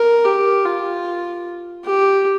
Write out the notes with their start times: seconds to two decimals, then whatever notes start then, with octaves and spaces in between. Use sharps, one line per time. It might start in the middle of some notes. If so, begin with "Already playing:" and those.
Already playing: A#4
0.25 G4
0.65 F4
1.85 G4